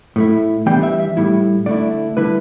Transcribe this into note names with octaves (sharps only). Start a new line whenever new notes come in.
A2 A3 E4
E3 G3 B3 D4 G5
E5
E5
A2 G3 E4
D3 A3 E4 D5
D3 G3 E4 B4